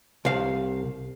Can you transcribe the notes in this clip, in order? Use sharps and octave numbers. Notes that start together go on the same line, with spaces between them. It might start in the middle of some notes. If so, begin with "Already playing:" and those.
C2 F5